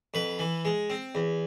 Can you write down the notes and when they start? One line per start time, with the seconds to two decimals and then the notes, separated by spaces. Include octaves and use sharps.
0.14 F2 B4
0.39 E3
0.65 G#3
0.90 C4
1.15 E2